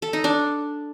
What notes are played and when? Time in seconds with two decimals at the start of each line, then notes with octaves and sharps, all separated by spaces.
0.02 A4
0.13 D#4
0.24 D4